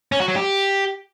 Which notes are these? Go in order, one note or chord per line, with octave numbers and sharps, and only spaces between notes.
C#4
F#4
F#3
G4